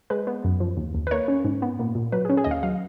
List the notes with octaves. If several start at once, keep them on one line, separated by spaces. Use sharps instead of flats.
G#3 B4
B3
F#2
F3
D#2
D#2
B4
A#3 C#5
C#4
G#2
B3
A#2
A#2
F#3 B4
G#4
C#4
G#4
D#2 D#5
F5
F#3 F5